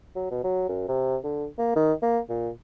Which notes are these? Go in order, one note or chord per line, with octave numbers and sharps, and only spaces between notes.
F#3
B2
F#3
F#2
C3
D3
A#3
D#3
A#3
A#2